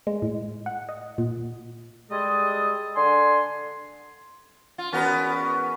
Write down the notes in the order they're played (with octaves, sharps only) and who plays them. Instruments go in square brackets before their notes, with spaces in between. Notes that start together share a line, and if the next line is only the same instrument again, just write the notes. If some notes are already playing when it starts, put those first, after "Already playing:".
[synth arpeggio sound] G#3
A2
F#5
D#5
A#2
[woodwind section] G3 G#3 G#4 A4 D#5
D3 G#5 C6
[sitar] F4
[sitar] E2 B3 A#4 [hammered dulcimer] C#4 F#4 B4